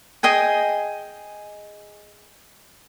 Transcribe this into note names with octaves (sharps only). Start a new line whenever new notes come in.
G#4 D#5 G5 G#5